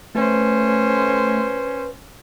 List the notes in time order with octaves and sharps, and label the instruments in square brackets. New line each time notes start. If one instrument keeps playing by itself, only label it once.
[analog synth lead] A3 [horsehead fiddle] C#4 C5 [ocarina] B4